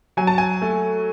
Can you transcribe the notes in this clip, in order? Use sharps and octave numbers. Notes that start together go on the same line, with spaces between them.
F#3 G#5
A5
G#5
A3